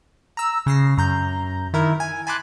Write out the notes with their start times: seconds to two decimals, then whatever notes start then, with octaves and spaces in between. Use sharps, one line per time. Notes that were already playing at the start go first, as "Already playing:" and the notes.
0.37 A#5 E6
0.66 C#3 A#6 C7
0.98 F#2 A#5 G6
1.73 D#3 E4 A#4
2.00 G#5
2.27 G#5 A5 B5 C6 D6 F#6